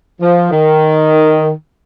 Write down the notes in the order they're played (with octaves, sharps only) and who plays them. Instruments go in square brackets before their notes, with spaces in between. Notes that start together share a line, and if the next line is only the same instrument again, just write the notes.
[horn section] F3
D#3